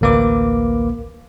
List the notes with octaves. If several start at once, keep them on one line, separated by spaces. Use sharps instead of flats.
A1 D2 A#3 B4 D6